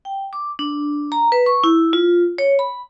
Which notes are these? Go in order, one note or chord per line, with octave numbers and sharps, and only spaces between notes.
G5
D6
D4
A#5
B4
C#6
E4
F4
C#5
B5